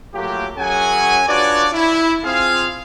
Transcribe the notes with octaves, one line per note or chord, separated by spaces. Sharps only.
F#3 A3 A#3 F4 G4
F#2 F#3 C#4 G#4 F#5 G#5
D4 F4 F#4 B4 C#5 D5
E4
C4 F4 G#4 F5